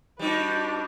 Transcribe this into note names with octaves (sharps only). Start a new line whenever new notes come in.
G3 D4 D#4 F#4 B4